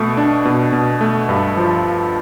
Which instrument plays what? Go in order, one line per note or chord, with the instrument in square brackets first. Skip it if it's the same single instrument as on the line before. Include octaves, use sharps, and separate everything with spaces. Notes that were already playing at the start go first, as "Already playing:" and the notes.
Already playing: [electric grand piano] B2 A3
D4
B2
B2
A3
G2
F3